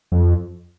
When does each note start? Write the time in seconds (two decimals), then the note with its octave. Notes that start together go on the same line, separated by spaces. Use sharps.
0.12 F2